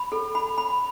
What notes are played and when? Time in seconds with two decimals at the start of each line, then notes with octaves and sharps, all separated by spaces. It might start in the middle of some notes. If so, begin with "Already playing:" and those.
Already playing: B5
0.12 A4
0.35 B5
0.58 B5